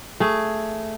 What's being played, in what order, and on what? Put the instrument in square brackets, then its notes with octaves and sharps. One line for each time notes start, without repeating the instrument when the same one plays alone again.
[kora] A3 G#4